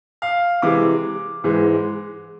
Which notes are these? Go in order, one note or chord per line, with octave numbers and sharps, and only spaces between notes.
F5
C3 E3 G#3 D6
G#2 E3 G#3